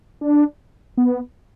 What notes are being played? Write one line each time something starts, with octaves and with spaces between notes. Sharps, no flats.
D4
B3